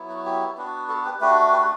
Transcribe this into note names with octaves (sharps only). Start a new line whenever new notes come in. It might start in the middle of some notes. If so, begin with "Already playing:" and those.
Already playing: F#3 B3 E4
F#4
G4
B3 D4 F#4
F#4 A4
G4 B4
A3 D4 F#4 G4 B4
G4 B4